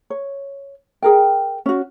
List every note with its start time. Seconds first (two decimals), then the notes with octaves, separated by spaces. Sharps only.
0.10 C#5
1.02 G#4 A#4 G5
1.66 C#4 F#4